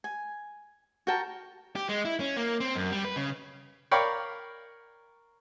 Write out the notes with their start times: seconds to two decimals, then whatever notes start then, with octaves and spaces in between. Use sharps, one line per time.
0.04 G#5
1.07 F#4 A#4 G5 A5
1.76 G4
1.89 G#3
2.05 E4
2.20 C#4
2.37 A#3
2.60 C4
2.76 F#2
2.92 G3
3.04 B4
3.16 C#3
3.91 A#4 C#5 D5 F5 G5 B5